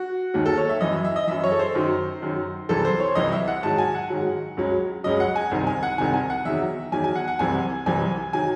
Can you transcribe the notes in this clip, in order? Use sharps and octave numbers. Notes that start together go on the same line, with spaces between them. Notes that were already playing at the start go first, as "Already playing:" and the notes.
Already playing: F#4
D#2 D#3 F#3
A4
C#5
E5
F#2 E3 D#5
E5
E5
D#5
F#2 E3 E5
C#5
A4
C5
F#2 D#3 F#3
F#2 D#3 F#3
C2 C3 E3 A4
C5
C#5
C2 C3 E3 D#5
E5
F#5
G#2 D#3 F#3 A5
G#5
F#5
G#2 D#3 F#3
C#2 C#3 F#3
C#2 C#3 F#3 D#5
F#5
G#5
C2 C3 D#3
G#5
F#5
C2 C3 D#3 G#5
G#5
F#5
E2 D#3 F#3 E5
E2 D#3 F#3 G#5
G#5
F#5
F#5
C2 C3 E3 G#5
C2 C3 E3 G#5
D#3 F#3 G#5